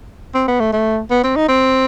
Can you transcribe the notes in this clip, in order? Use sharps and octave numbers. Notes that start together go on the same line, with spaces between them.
C4
B3
A3
A3
B3
C4
D#4
C4